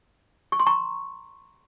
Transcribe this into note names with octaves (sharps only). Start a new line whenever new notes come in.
C#6
C6
A#5 C#6